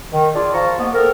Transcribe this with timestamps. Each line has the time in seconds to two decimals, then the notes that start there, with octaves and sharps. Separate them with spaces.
0.12 D#3
0.35 D4 F4 G#4 D5
0.54 F3 F5 A5 A#5 C#6
0.79 G#2 A#3 B3
0.94 C4 A4 A#4